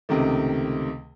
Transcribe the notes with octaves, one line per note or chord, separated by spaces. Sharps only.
C#2 C3 D#3 A3